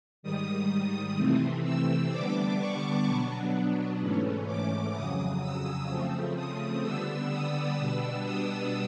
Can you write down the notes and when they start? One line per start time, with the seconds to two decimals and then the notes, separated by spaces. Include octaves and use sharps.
0.23 G#2 D#3 G3 D#6
1.17 C3 E3 A3 C4
1.64 E6
2.11 D3 G3 B3 D4 D6
2.58 C#6
3.05 B2 F#3 B3 D4
4.00 G#2 E3 A3 C#4
4.47 D6
4.94 F2 C#3 F#3 D#6
5.41 E6
5.89 C#3 F3 A3 C4
6.36 D#6
6.83 D3 G3 B3 D4 E6
7.30 D#6
7.77 B2 G3 B3 D4 E6
8.24 D#6